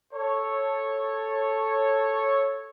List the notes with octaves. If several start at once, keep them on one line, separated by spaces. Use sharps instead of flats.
A4 C#5